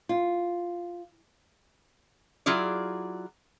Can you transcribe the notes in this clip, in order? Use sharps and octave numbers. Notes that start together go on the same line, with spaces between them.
F4
F#3 E4 F4 G#4 D5